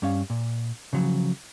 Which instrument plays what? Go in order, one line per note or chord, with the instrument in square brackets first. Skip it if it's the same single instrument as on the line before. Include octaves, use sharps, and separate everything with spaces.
[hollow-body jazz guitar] G2 C#4 F5
A#2
C#3 F3 F#3